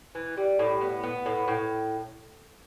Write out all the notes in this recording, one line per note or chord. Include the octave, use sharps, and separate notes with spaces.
E3
G3
A2
B3
B3
A2
A2